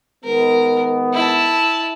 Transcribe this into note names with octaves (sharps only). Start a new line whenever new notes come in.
D#3 G#3 B3 A#4
E4 A5